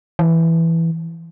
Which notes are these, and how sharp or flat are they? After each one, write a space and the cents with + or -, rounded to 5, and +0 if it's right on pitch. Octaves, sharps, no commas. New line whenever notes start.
E3 +0